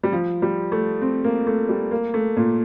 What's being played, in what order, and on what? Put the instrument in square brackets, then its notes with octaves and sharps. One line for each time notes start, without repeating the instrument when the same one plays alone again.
[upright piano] G3
F3
G3
A3
C4
A#3
A3
G3
A#3
A3
A#2